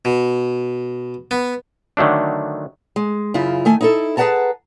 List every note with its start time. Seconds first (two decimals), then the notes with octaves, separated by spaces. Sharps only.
0.05 B2
1.31 B3
1.97 D3 D#3 F#3 A3 D4
2.96 G#3
3.34 F#2 C#3 E4 F4
3.65 D#3 A3 G#5
3.81 D#4 E4 A4
4.17 G#4 B4 C#5 F#5 A5 A#5